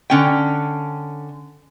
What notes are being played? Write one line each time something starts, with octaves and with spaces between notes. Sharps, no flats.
D3 C#4 G5